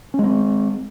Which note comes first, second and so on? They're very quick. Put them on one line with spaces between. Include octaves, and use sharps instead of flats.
C#4 G#3 C4